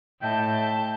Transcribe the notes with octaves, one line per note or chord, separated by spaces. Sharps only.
A2 D#5 E5 G5 A5 G6